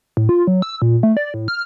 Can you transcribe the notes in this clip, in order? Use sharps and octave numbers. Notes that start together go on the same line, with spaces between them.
A2
F4
F#3
E6
A#2
A3
D5
A2
F6